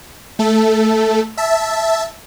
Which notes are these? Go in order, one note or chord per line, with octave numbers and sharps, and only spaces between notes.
A3 A4
E5 A5